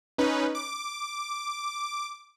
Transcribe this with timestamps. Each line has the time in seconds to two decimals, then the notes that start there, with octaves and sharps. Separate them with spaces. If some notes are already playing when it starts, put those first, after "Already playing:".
0.18 C#4 D#4 B4
0.55 D6